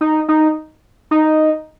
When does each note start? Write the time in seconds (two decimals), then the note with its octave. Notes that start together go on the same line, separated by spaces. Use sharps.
0.01 D#4
0.28 D#4
1.11 D#4